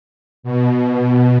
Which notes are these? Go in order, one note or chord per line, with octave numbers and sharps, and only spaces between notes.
B2